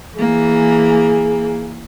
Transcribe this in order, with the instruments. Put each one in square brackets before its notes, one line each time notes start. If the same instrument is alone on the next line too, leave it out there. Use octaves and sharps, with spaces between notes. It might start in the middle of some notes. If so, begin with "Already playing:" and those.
[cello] E3 A#3 [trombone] G#4